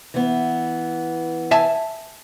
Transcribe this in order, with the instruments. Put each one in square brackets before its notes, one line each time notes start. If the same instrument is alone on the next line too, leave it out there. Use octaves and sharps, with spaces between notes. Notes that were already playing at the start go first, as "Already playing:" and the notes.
[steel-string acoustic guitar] E3 B3
[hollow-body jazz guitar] E5 G#5 A5